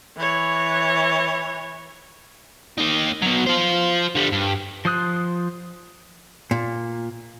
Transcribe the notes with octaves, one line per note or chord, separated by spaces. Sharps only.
E3 C#5
A#3 D#4
B2 F#3
F4 C5
D3 G3
G2
F3 C5 D#6 F#6
A#2